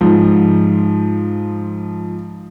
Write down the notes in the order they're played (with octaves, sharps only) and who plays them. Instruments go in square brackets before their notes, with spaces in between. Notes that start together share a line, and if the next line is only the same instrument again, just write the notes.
[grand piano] G#2 F3